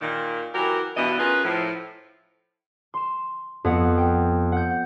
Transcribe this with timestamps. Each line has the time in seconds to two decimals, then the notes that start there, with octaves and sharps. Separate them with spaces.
0.01 A#2 D#3
0.55 E3 F#3 G4 A#4
0.96 G2 B2 E3 B3 D4 D#5
1.19 C#4 F4 G#4 A#4 B4
1.44 A2 F3
2.94 C6 E7
3.64 F2 B3 F#5
3.98 G5
4.52 F#5 G6